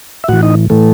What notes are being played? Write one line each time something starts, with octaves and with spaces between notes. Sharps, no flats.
E5
A2 E3 F#4 F#5
D#4 D#5
A2 E3 A3 A4